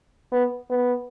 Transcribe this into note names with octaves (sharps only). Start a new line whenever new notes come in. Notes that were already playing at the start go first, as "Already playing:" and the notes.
B3
B3